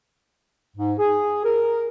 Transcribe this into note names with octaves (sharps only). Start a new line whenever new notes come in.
G#2
G#4
A#4